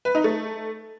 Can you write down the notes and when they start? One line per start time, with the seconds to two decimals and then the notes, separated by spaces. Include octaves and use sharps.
0.05 B4
0.15 D#4
0.24 A3